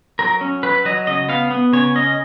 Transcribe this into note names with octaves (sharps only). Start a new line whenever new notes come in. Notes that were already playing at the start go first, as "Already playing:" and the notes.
F#3 A#4
C#4
F#3 B4
F#3 D#5
C#3 D#5
B3 F5
B3
C#3 C#5
C#4 D#5